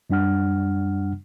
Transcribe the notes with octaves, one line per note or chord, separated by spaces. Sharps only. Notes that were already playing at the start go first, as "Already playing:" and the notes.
F#2 G3 D4 F#5 F6